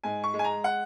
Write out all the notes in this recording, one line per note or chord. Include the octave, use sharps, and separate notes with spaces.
G#2 G#5
C#6
G#3
G#5
A#5
F#5